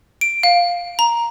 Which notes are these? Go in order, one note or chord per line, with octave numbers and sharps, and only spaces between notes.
D7
F5
A#5